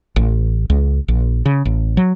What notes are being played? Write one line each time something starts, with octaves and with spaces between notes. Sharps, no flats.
A1
C#2
A#1
C#3
A1
F#3